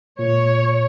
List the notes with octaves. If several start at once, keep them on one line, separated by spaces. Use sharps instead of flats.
A#2 C#5